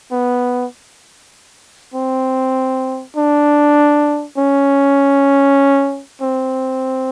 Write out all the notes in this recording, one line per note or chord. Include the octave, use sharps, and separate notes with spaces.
B3
C4
D4
C#4
C4